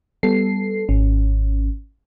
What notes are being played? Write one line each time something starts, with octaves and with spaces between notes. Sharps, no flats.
G3 B3 A4 C7
G#1 C#4